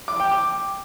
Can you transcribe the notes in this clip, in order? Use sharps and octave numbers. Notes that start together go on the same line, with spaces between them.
D6
G5
D6